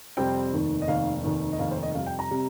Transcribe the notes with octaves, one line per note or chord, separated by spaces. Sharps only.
F2 C3 G3 C4 G5
F1 D#2 D#3
D#5
F1 D#2 D#3 F5
F1 D#2 D#3
D#5
F1 D#2 D#3 F5
C5
D#5
F2 C3 G3 F5
G5
A#5
C3 G3